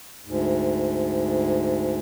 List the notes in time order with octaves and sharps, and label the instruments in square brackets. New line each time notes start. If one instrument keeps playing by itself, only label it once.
[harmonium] D2 G#2